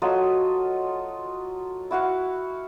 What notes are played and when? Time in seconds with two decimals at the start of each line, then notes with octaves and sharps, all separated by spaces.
0.02 F#3 F4 A4 D#5
1.91 E4 F#4 F5 F#5